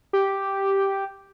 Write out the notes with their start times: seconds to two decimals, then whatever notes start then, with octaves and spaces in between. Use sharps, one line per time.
0.13 G4